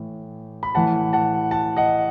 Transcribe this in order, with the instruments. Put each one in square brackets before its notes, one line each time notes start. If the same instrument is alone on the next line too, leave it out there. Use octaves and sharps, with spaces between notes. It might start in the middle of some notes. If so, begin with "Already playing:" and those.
Already playing: [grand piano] A2 E3
B5
A2 E3 F#5 A5
F#5 A5
F#5 A5
D#5 F#5